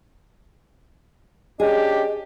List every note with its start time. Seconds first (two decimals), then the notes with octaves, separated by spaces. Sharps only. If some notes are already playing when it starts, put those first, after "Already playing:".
1.60 C#4 D4 G4 G#4 D#5